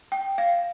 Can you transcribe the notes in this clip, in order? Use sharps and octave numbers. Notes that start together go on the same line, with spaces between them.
G5
F5